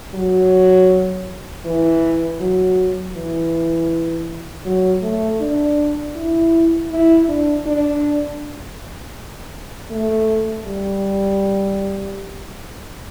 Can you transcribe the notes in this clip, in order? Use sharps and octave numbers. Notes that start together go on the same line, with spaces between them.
F#3
E3
F#3
E3
F#3
A3
D4
E4
E4
D4
D4
A3
G3